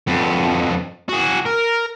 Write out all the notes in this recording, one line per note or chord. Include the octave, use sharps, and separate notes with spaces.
F2 B3
F#4 G#4
A#4